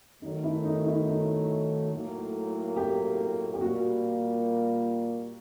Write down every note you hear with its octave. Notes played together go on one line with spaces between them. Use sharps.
D#3 F#3 A3 D#4
E4
D#4
E4
D#4
A2 F#3 A#3
G4
G4
A#2 G3 A#3 F#4